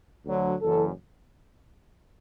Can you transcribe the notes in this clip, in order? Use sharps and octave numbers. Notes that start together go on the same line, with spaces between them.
D2 D3 F#3
F#1 F#2 E3 A4